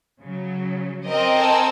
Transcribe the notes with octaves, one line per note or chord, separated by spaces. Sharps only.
C#3 F#3
C4 A#4 D#5
A4 G#5 E6